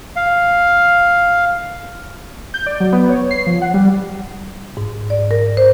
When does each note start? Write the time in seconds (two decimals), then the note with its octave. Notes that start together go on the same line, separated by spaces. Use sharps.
0.16 F5
2.54 G6
2.66 D5
2.80 F#3
2.92 B3
3.09 C#5
3.31 C7
3.47 F3
3.62 F#5
3.74 G3
4.77 G#2
5.10 D5
5.31 A#4
5.57 C5